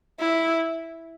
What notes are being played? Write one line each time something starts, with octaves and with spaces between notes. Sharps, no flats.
E4